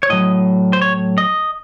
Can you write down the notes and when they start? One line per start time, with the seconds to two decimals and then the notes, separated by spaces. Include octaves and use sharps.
0.03 C#5
0.10 A2 F#3 D#5
0.73 C5
0.82 C#5
1.18 D#5